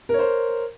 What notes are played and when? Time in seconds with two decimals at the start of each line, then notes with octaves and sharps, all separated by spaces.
0.09 A#4
0.14 C#5
0.19 C5